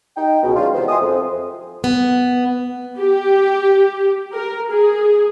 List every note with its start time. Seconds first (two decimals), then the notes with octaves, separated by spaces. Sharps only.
0.17 D#4 G5
0.42 C#2 B2
0.56 D#3 F#3 G#3 C#4 D4 F4
0.74 C3 D#3 E3 B3 D#4 C5
0.89 D#5 E5 G#5 C6 D#6
1.01 F2
1.84 B3
2.99 G4
4.35 A#4
4.71 G#4